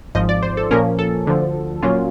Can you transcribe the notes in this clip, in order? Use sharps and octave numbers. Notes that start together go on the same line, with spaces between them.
G#1 G#2 F3 D#5
D5
C5
A4
A#2 F3 A#3 C#4 A#4
A4
D2 D3 F3
A#2 F#3 A#3 C#4 F4